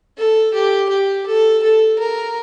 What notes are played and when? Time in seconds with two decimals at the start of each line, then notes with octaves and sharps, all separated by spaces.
0.18 A4
0.54 G4
0.89 G4
1.26 A4
1.63 A4
1.99 A#4